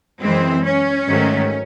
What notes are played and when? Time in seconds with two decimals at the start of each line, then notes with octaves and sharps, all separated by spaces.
0.21 F#2 E3 G#3 C4
0.64 C#4
1.08 G#2 D#3 F#3 A3